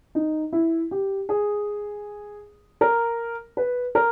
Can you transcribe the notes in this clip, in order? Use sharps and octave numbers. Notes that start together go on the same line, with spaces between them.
D#4
E4
G4
G#4
A#4
B4
A#4